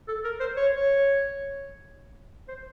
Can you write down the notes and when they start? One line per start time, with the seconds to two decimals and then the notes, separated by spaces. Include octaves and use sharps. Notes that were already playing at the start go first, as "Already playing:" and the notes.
0.08 A4
0.25 A#4
0.40 C5
0.57 C#5
0.76 C#5
2.48 C5